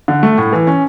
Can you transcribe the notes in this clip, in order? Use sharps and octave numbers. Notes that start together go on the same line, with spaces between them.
D3
A3
A2
E3
C#4